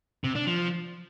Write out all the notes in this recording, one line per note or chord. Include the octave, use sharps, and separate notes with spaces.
C3
D4
F3